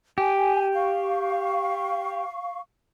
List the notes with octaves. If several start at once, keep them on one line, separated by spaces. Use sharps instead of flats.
G4 G#5
F5 C#6